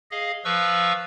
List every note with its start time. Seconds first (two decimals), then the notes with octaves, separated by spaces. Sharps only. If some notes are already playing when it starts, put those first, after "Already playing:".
0.11 G#4 D#5 F5
0.45 F3 B4 F5 C#6 E6